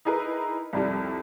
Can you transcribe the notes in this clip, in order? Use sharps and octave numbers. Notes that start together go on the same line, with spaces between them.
D#4 E4 G#4 A#4 B4
C2 F2 G3